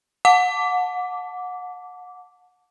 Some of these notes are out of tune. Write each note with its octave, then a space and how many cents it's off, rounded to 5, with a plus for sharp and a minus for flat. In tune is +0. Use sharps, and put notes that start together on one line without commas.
F#5 -30 A5 +0 D6 -15